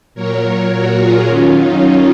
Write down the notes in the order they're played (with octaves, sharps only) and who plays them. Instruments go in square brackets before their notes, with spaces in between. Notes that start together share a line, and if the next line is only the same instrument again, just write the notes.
[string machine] A#2 F#3 A#4 C#5
F#4 A#4
F4 G#4
F#2 D#3 F#3 C#4 F4
D#4